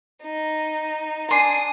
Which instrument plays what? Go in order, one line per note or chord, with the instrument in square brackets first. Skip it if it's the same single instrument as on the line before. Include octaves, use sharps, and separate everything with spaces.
[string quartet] D#4
[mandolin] D4 C6 [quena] G#5 [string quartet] D#6